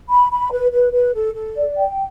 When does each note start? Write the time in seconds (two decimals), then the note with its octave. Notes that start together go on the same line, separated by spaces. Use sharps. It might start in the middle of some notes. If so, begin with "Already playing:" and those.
0.10 B5
0.31 B5
0.51 B4
0.72 B4
0.93 B4
1.13 A4
1.34 A4
1.56 D5
1.77 G5